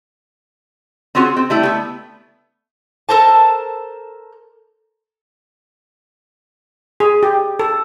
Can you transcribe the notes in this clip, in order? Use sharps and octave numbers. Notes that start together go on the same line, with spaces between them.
C4 C#4 F4 F#4 G#4
C4
G3 A3 E4
A3 B3
A4 A#4 C5 A5
G#4
G4
A4